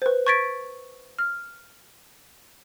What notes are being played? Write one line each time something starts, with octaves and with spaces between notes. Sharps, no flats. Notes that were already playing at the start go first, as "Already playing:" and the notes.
B4 C5
C#6 G#6 A6 B6 D7
F6